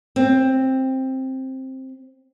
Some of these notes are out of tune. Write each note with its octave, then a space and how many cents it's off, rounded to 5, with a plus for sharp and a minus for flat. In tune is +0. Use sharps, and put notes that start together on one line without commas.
C4 +10